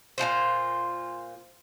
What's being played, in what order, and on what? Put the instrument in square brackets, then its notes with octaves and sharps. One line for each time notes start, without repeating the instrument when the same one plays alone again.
[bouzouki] A#2 F3 F4 C5